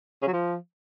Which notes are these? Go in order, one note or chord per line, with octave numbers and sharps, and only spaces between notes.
C#3
F#3
F3